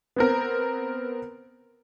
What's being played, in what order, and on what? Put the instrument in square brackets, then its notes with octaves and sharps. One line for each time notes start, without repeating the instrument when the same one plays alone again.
[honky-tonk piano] B3 C4 A#4